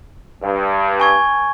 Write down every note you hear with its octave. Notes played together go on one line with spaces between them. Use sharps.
G2
G#5 C#6 G#6